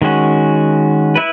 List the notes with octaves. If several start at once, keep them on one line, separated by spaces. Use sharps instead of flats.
D#3 G#3 C#4 F#4
E4 B4